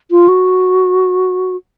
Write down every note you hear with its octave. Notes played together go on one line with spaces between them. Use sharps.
F4
F#4